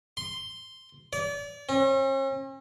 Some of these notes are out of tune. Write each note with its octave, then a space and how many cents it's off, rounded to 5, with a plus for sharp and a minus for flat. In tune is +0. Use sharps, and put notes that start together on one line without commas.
C6 +0
D5 -35
C#4 -45